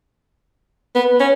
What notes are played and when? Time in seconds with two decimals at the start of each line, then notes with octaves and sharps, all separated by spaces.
0.95 B3
1.20 C#4